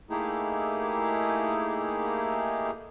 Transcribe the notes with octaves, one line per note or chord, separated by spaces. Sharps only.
A3 A#3 D#4 E4 G4 G#4